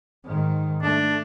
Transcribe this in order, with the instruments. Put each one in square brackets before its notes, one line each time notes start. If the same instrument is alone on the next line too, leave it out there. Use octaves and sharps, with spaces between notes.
[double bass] G#2 D#3
[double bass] A3 [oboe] D4